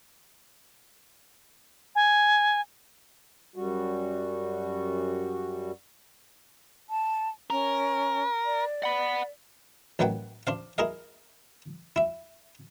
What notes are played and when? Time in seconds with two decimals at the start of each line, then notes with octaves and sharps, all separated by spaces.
1.95 G#5
3.56 F#2 G3 F#4
6.90 A5
7.50 C#4 A#4
8.45 D5
8.83 F#5 B5
9.99 A1 D#3 F#3 B4 F#5 G5
10.47 D4 C5 F5
10.78 E4 G#4 A#4 D#5 F5
11.96 E4 E5